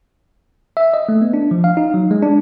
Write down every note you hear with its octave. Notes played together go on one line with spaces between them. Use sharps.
E5
D#5
A3
B3
D4
F3
F5
D#4
F#3
G#3
D4